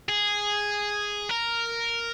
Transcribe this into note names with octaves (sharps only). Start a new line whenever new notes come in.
G#4
A#4